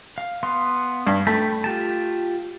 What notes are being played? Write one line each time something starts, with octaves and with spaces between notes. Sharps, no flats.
F5
B3 F5 C6
G2
A3 G5 A5 B5
F4 G4 A5